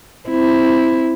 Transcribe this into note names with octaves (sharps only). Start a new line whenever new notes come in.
C4 E4